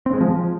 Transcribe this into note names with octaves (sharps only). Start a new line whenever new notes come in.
C4
G#3
F3